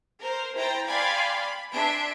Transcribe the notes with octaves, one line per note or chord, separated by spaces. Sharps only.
A#4 C5
E4 C5 G5 A#5 A6
D5 F5 G5 G#5 B5 C6
B5
D4 E5 G#5 C6 D7